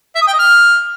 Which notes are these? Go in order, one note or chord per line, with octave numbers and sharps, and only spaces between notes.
E5
D#6
G5
D#5
F6